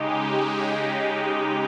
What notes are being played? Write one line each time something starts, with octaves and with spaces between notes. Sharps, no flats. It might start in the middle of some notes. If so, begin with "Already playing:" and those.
Already playing: C#3 G#3 D#4 G4